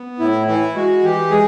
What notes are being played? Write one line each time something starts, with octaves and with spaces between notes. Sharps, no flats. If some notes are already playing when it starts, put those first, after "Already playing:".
Already playing: B3
A2 E4
E3 E4
G#3 F#4
E3 G4
G#3 G#4